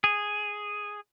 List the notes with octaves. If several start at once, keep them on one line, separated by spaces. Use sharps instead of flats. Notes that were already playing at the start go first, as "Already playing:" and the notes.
G#4